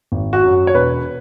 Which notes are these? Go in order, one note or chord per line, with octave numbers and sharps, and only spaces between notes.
G#1
F#4
F#2 F#3
C#5
E1 B4